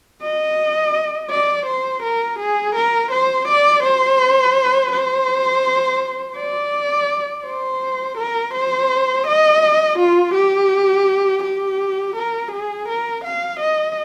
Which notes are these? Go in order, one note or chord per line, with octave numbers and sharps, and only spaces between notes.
D#5
D5
C5
A#4
G#4
A#4
C5
D5
C5
C5
D5
C5
A#4
C5
D#5
F4
G4
G4
A#4
G#4
A#4
F5
D#5